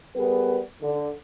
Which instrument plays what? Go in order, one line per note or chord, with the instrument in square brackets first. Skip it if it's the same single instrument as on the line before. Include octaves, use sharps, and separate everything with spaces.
[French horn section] G3 B3 G#4 A#4 B4
D3